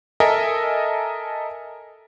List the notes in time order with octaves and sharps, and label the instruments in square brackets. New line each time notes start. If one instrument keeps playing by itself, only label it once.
[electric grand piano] A4 A#4 D#5 E5 G#5